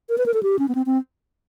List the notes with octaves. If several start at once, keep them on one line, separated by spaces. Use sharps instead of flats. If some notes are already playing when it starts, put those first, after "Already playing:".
A#4
B4
A#4
A4
G4
C#4
B3
C4
C4